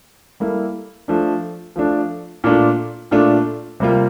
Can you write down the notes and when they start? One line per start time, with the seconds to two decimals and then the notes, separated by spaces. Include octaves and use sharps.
0.40 G3 A#3 E4 A4
1.08 F3 A3 D4
1.76 F3 A3 D4
2.44 A#2 A3 D4 F4
3.11 A#2 A3 D4 F4
3.80 C3 G3 A#3 F4